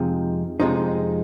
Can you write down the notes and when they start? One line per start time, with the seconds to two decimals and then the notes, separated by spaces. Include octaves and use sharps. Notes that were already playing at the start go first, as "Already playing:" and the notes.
Already playing: F2 C3 F3 G#3 D#4
0.60 F2 C3 F3 G#3 D#4